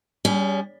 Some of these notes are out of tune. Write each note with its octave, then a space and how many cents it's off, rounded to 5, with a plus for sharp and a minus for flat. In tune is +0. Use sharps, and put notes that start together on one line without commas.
G3 +0 C#4 +30 G#4 -25